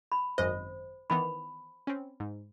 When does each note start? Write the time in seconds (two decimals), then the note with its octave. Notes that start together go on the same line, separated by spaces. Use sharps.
0.12 B5
0.38 G#1 F#2 C5 D#5
1.10 D#3 E3 B3 B5
1.87 C4 C#4
2.20 G#2